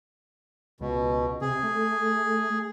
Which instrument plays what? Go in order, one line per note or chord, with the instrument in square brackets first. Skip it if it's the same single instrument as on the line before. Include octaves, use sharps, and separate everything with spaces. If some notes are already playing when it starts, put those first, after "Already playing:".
[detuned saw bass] C#2 [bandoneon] B2
[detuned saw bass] C3 [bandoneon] G#4
[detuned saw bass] A3